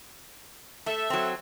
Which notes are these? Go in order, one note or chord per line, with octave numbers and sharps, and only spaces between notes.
A3 A4 E5
F#3 C4